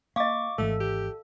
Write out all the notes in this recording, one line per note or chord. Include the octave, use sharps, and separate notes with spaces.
A#3 D#5 F5 C#6 D6
G#1 G#2 E3 A3 A4
G4